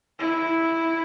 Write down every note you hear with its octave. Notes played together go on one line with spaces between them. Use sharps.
E4